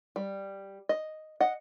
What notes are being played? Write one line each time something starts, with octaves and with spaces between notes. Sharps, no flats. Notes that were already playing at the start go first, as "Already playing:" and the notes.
G3
D#5
D#5 F#5